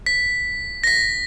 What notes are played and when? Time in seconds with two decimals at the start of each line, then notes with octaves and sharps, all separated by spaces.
0.06 B6
0.84 A#6
0.87 B6